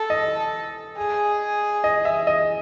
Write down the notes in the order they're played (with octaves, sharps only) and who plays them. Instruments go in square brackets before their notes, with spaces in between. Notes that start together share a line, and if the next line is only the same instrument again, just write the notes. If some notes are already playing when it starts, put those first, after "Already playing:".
Already playing: [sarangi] A4
[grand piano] D#5
[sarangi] G#4
[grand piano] D#5
E5
D#5